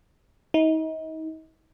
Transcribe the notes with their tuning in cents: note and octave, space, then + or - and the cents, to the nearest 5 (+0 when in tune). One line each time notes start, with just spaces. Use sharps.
D#4 +35